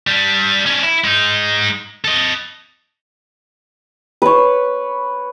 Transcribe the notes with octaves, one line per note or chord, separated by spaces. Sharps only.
G3 D4
C#4 D4
E4
G#3 D#4
A4 D#5
B4 C#5